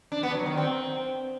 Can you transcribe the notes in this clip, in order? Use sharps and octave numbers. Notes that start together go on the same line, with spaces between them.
D4
B3
F#3
D#3
C4